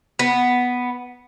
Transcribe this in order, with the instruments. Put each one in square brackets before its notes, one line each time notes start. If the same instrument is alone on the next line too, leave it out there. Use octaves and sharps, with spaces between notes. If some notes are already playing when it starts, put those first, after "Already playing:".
[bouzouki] B3